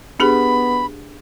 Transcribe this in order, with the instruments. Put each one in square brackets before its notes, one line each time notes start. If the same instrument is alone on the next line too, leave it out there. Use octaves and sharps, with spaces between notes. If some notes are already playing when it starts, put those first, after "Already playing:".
[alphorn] B3 [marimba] D4 G4 G#4 [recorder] B5